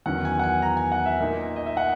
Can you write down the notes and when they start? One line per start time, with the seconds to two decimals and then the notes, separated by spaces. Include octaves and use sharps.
0.06 E2 D#3 F#3 C#4 F#5
0.25 G#5
0.39 F#5
0.44 G#5
0.62 A#5
0.77 G#5
0.92 F#5
1.06 E5
1.20 A#2 A#3 D#4
1.56 D#5
1.66 E5
1.77 F#5